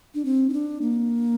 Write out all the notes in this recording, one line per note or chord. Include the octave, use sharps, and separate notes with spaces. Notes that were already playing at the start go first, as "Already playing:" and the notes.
D4
C4
D#4
D4
A#3